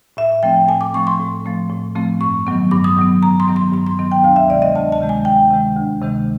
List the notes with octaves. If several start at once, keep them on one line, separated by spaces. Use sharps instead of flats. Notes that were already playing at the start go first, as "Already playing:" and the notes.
A2 E5
F3 A3 C4 G5
A2 G#5
D6
F3 A3 C4 C#6
C6
A2
F3 A3 C4
A2
F3 A3 C4
G2 C#6
D#3 F#3 B3
G2 D6
D#6
D#3 F#3 B3
G2 A#5
C6
D#3 F#3 B3
C6
G2 C6
C6
D#3 F#3 B3
G5
D2 F5
E5
C3 D#3 G#3 D5
D#5
D2 A5
A5
C3 D#3 G#3
G#5
D2 G5
C3 D#3 G#3
D2
C3 D#3 G#3